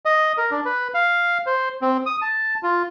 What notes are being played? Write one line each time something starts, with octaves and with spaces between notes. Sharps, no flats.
D#5
A#4
D4
B4
F5
C5
C4
D#6
A5
F4